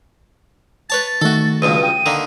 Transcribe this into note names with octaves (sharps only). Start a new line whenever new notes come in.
B4 C#5 A5 A6
A6
D#3 A3 F#4 A4
C#2 G2 B2 D#7
G5 D#7
D3 D#3 A#3